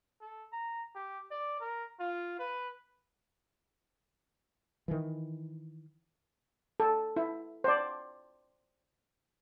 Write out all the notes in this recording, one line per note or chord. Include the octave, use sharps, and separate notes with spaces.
A4
A#5
G4
D5
A#4
F4
B4
D#3 E3
A4
E4
C5 D5